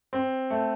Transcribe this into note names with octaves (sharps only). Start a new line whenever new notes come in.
C4
A3